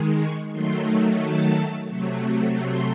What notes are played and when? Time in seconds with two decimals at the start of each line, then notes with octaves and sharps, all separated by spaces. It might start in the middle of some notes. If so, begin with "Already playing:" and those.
Already playing: D#3 G#3
0.18 C#6
0.52 D#3 F#3 A3 C6
1.20 A5
1.87 C3 F#3 A3
2.56 C6